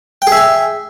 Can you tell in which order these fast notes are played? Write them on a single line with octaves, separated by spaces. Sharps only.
G5 G#4 E5 G#5